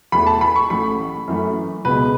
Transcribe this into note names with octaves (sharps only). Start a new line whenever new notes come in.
E2 E3 A3 B5
A5
B5
C#6
A1 A2 A3 B5
F#2 E3 A3
C#2 B2 B3 B4